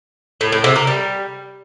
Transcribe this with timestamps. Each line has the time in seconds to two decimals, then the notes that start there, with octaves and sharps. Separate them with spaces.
0.41 A2
0.52 A2
0.64 C3
0.76 A#3
0.87 G3